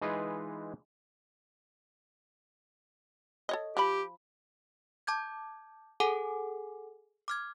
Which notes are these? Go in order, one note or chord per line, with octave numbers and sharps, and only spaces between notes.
E3 G#3 D#4 F4 G#4 B4
A4 C#5 D#5
F3 G4 B5
A5 D6 G6 G#6
G#4 A4 F#5 G#5 D6
D6 F6 G#6